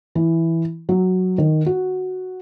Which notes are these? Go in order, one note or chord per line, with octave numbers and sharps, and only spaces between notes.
E3
F#3
D#3
F#4